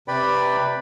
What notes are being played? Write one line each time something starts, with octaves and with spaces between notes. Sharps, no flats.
C3 B4 D5 G5 B5